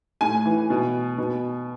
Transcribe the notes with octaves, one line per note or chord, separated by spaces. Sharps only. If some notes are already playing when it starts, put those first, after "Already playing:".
A2 G#5
E3
B2
B2